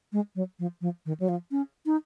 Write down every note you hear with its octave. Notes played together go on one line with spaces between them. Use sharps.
G#3
F#3
F3
F3
D#3
F#3
F3
C#4
D#4